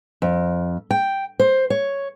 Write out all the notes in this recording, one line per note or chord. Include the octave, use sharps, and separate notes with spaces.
F2
G5
C5
C#5